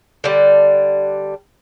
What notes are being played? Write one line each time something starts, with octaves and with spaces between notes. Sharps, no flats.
D3 G3